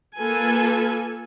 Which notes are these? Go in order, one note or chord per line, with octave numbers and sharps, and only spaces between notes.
A#3 F4 A4 B4 G#5